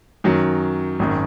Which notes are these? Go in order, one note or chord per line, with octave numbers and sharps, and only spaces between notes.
F#2 D#3 F#3
G#1 F#2 D#3